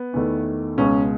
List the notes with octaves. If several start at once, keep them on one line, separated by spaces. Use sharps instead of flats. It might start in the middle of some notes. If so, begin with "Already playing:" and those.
Already playing: B3
E2 D#3 A3
C#2 B2 G#3 C#4